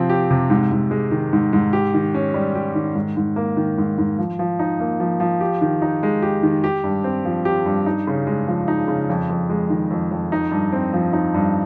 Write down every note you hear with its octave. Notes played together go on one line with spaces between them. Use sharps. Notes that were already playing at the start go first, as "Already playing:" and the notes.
Already playing: C3 F3 C4
G4
C3
G#2
G#2
G#3
D#3
G#2
G#2
G4
D#3
C#4
G3
G4
D#3
G#2
G#2
A#3
D#3
G#2
G#2
F3
F3
D#4
A#3
F3
F3
G4
D#3
D#4
G#3
G4
D#3
G4
G2
C4
F3
G4
G2
D#4
C#3
G#3
F3
D#4
C#3
F2
F2
G#3
D#3
F2
F2
D#4
G2
C4
F3
D#4
G2